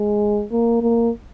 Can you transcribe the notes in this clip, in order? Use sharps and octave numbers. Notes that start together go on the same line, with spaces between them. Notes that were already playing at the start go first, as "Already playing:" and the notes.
Already playing: G#3
A#3
A#3